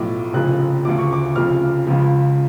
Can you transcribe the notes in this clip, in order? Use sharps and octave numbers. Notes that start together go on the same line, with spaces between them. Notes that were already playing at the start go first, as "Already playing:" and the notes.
Already playing: B1 A2 F3 D6
F1 F2 C#3 F3 F#6
D2 C#3 F3 D6
C#6
D6
F1 F2 C#3 F3 F6
C#2 C#3 F3